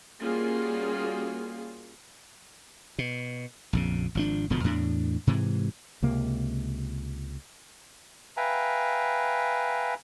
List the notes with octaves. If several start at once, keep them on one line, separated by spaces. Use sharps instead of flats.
G3 A#3 C#4 F4 F#4 G#4
B2
A#1 F2 C#3
G#1 F3 D4
E1 B2 D3 F3
E2 A2 D4
G#2 C3 E3
C#2 C3 A#3
B4 E5 F5 G5 G#5 A#5